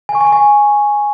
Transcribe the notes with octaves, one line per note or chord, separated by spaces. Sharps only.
G#5
C#6
G#5
C#6
G#5